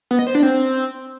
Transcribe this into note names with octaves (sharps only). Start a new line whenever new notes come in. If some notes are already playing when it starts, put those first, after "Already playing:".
B3
D#5
C5
D4
C4